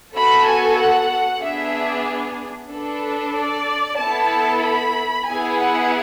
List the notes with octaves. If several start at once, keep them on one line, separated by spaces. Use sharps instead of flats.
B3 F#4 A4 B5
G#5
F#5
B3 D4 G#4 E5
D4 A4 B4
D5
B3 E4 A4 A5
B5
B3 E4 G#4 G#5
F#5